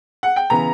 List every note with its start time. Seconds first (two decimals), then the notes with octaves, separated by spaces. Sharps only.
0.23 F#5
0.36 G5
0.50 C#3 E3 B3 A#5